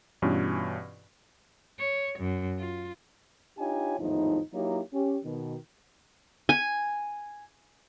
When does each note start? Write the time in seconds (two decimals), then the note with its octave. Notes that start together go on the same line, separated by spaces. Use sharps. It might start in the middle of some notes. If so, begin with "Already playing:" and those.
0.22 G2 B2 E3 C#4 F4
1.79 C#5
2.19 F#2
2.59 F4
3.58 D4 D#4 F4 G4 C#5 G#5
3.98 G#1 E2 A2 F3 D#4
4.53 F#3 A#3 D#4 E4 G4 C#5
4.93 C#4 G4
5.24 B2 D#3
6.49 G#5